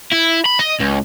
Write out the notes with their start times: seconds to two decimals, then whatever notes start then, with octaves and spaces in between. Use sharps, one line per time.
0.12 E4
0.45 B5
0.59 D#5
0.80 C#2